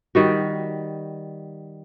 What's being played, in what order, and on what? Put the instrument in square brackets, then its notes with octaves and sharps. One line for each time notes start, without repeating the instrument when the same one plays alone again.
[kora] D#3 G3 F#4